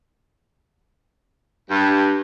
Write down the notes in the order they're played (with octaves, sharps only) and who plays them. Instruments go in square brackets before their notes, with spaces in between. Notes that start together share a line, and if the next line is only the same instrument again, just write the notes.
[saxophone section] G2